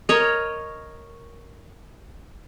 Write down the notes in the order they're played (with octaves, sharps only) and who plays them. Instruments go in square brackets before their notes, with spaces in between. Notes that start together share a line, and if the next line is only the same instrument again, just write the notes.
[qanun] A#4 C#5 D#5